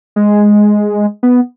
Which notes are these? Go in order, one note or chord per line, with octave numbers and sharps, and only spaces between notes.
G#3
B3